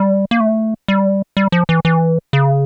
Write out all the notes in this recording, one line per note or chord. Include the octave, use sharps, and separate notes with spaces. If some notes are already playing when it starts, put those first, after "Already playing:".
Already playing: G3
A#3
A3
G3
G3
F3
E3
E3
C#3